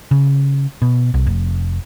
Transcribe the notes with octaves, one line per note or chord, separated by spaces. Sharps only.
C#3
B2
C2
F1